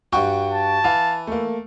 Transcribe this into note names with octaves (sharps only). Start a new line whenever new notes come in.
G2 F#4 G5 C#6
A5
E3 F5
A3 A#3